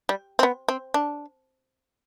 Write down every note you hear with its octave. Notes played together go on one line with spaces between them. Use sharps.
G3
C4
B3
C4
D4